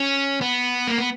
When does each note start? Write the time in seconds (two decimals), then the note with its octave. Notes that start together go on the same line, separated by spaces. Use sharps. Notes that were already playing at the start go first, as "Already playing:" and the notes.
Already playing: C#4
0.41 B3
0.88 A#3
0.98 B3